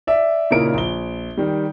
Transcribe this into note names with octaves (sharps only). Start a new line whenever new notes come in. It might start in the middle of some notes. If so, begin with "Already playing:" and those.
D5 E5
A#2 C#3 D#4 E4 A#4 D7
A#1 G7
D#3 G3